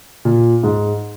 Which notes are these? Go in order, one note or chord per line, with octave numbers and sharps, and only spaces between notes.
A#2
G#2